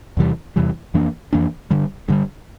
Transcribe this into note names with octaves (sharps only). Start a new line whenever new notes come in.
E2 C3 E3 G3
E2 C3 E3 G3
F2 E3 A#3 D4
F2 E3 A#3 D4
G2 D3 G3
G2 D3 G3